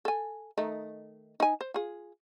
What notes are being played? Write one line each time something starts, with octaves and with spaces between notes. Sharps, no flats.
A4 G#5
D#3 A3 D#4
D#4 G#5
C5
F4 G#4